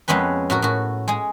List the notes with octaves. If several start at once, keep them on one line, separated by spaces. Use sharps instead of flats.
F2 G#3 B3 C#4 B4
A2 F#4 A#4
A2 F#4
G#3 G#4